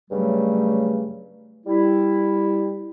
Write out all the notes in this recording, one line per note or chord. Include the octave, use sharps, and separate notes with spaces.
G2 C#3 F#3 G3 A3
G3 E4